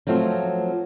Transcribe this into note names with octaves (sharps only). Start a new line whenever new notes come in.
F3 F#3 A3 C4 F4